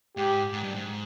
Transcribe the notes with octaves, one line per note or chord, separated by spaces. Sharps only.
G#2 G4
G#2
G2
G#2